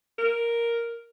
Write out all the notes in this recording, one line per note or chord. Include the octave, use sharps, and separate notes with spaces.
A#4